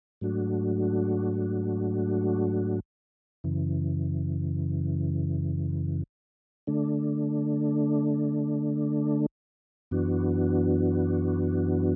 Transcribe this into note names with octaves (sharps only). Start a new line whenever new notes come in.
G#2 F#3 A3 D4 F#4
F#2 C#3 E3
D3 A3 D4
F#2 E3 B3 D4 F#4